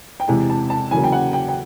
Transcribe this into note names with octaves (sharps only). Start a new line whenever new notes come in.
G5
E2 C3 E3 G#3 G#5
A5
A5
E2 C#3 F#3 A#3 G#5
G5
F#5
G5
G5